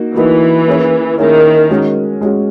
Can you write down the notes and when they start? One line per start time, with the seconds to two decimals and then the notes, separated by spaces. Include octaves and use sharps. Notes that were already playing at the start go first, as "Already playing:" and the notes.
Already playing: A#3 D#4 F#4
0.15 E3 A#3 D#4 F#4 B4
0.67 A#3 C#4 E4 G#4 C#5
1.18 D#3 A#3 C#4 E4 G#4 C#5
1.70 G#3 C#4 F#4
2.21 G#3 C#4 F#4